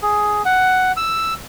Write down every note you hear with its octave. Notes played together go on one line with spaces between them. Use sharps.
G#4
F#5
E6